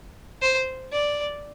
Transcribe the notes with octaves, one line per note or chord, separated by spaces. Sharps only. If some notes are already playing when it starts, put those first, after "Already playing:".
C5
D5